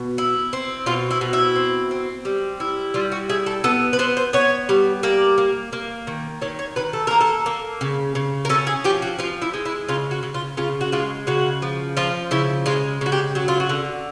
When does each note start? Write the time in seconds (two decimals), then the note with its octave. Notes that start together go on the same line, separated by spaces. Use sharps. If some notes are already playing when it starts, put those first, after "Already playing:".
Already playing: B2
0.18 E4
0.53 C4
0.86 B2 F4
1.11 E4
1.21 B2
1.33 E4
1.56 C4
1.91 C4
2.25 G3
2.60 E4
2.94 G3 F4
3.12 F#4
3.29 E4 G#4
3.46 A4
3.64 B3 A4
3.93 B4
3.99 B3 C5
4.17 C5
4.33 B3 C#5
4.69 G3
5.03 A#3 D5
5.38 A#3
5.73 A#3
6.07 D#3
6.42 D#3 C#5
6.59 C#5
6.76 D#3 B4
6.93 A4
7.07 A#3 A#4
7.21 A4
7.46 A#3
7.81 C#3
8.15 C#3
8.45 A#4
8.49 C#4 A4
8.67 G#4
8.84 F3 G4
9.02 F#4
9.19 F3 F4
9.42 E4
9.54 G#3
9.65 E4
9.89 C#3 F4
10.11 F#4
10.23 C#3
10.34 F4
10.57 C#3 F4
10.81 F#4
10.92 G#3 F4
11.27 C#3 F#4
11.62 F3
11.97 F3 F4
12.31 C#3 E4
12.66 G#3 F4
13.01 C#3 F#4
13.12 G4
13.35 F#3 F#4
13.48 F4
13.60 F#4
13.69 D3